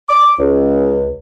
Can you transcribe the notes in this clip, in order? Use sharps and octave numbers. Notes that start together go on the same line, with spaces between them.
D6
C#2